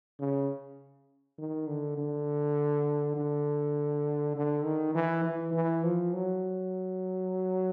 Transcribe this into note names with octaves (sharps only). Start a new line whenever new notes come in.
C#3
D#3
D3
D3
D3
D3
D#3
E3
E3
E3
F3
F#3